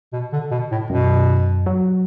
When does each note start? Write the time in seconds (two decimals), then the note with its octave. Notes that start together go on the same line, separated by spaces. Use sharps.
0.13 B2
0.32 D3
0.51 B2
0.71 A2
0.90 F#2 B2
1.66 F#3